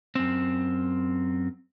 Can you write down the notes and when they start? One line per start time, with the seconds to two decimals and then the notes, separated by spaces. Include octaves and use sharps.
0.15 F#2 C4